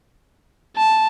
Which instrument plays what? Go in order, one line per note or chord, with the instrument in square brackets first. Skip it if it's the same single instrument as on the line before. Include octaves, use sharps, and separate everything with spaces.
[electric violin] A5